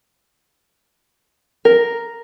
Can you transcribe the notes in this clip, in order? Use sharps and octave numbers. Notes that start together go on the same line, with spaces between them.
A#4